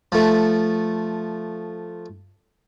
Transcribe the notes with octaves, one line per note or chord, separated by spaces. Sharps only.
F3 A3